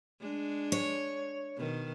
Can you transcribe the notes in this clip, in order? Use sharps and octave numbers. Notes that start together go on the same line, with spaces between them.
G#3 D4
C#5
B2 D#3